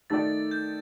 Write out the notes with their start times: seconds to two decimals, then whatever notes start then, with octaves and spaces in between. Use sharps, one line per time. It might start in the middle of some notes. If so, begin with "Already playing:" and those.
0.10 D#3 A3 D#4 A4 D5 A6
0.51 G6